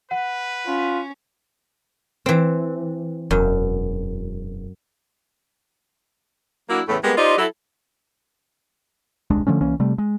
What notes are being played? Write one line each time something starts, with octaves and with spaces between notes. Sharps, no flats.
B4 F#5
C#4 F4
E3 C4
E1 F#2
F#3 A#3 D4 E4 F#4
E2 A2 C#3 E3 A3
G3 G#3 A#3 B3
D#4 F4 G4 C5 D5 D#5
F#3 E4 A4
D#1 C2 G#3 D4
D3 F3 A3 C#4
C2 E3 A#3 C#4
C3 G3 A3
G#3